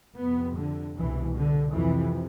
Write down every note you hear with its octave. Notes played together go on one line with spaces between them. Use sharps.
F2 C3 B3
D3
C2 B2 E3
D3
F2 C3 E3